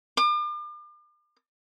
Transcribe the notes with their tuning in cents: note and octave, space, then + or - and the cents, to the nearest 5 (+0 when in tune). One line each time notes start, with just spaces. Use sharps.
D6 +40